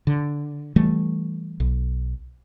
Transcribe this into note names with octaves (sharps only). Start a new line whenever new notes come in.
D3
E3 G3 A3
B1